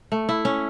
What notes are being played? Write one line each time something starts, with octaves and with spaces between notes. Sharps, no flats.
A3
E4
C#4